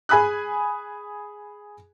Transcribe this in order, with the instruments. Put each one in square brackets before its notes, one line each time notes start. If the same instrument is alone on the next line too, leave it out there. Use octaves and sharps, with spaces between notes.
[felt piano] G#4 G#5 B5 D#6 F#6